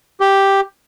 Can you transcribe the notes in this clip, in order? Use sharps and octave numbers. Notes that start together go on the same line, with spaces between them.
G4